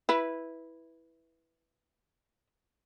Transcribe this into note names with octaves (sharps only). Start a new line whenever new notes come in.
E4 B4